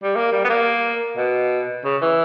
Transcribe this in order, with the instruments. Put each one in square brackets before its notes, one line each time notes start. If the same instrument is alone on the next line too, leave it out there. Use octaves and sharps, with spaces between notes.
[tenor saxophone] G3
A#3
G3
B3
A#3
B2
C#3
E3